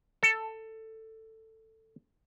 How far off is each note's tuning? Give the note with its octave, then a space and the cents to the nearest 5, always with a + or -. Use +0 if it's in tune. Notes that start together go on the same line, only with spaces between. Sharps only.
A4 +10